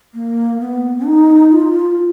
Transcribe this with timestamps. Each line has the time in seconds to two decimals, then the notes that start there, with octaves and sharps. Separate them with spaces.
0.14 A#3
0.61 B3
1.06 D#4
1.52 F4